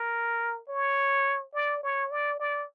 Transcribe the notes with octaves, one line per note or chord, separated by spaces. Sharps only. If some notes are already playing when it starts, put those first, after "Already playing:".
Already playing: A#4
C#5
D5
C#5
D5
D5